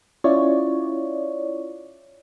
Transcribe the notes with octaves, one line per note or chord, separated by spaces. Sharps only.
C#4 E4 F4 C#5 D5